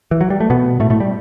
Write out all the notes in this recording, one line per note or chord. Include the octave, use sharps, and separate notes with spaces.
E3
F#3
G3
A3
B2 B3
A2 A3
A2 A3
G3